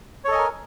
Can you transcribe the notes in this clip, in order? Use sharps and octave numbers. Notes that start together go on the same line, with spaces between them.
A4 A#4 C#5 D#5 G#5